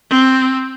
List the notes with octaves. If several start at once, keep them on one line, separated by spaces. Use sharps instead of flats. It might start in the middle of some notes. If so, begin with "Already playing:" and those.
C4